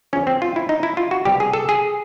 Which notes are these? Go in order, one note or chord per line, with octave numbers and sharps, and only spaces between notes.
E2 C#3 F3 C#4
C4
F4
E4
D#4
E4
F4
F#4
C2 B2 G3 G4
G#4
A4
G#4